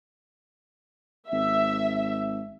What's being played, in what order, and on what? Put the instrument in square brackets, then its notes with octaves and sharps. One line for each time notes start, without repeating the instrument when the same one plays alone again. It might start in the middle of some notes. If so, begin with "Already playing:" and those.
[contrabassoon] G#1 [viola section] E5